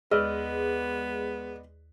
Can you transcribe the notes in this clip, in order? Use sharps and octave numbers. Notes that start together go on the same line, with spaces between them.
D#2 G#3 B3 B4 D5 D#5 E6 F6